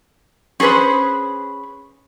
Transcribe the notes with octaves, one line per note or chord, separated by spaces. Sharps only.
C#4 G#4 A4 B4 C5